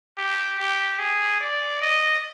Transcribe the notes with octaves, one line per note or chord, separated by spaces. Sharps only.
G4
G4
G#4
D5
D#5